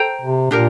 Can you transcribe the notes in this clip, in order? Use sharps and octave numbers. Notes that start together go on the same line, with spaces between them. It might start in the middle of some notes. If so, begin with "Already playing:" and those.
Already playing: A4 C5 G5 A#5
C3
A#2 D4 G4 A#4